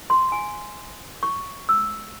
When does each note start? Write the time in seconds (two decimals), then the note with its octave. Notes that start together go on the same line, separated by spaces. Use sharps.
0.10 C6
0.32 G#5
1.23 C#6
1.69 E6